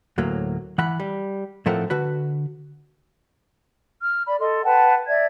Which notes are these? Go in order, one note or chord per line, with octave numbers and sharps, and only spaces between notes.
D2 A2 F#3 A#3
E3 F#5 B5
G3
A2 F3 A3 C4 A#4 F#5
D3 F#4 B4
F6
D5 B5
A4 D#5 C6
B4 F#5 G5 A5
D5 E5 G#6